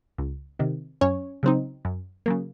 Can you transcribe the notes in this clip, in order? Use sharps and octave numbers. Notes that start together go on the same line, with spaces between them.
C#2
C3 D#3
F#2 C#4 C#5
C#3 F#3 C4 D#4
F#2
C#3 F#3 A#3